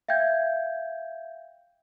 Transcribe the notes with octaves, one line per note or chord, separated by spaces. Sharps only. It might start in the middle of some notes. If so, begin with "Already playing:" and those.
E5 F5 G5 G6 G#6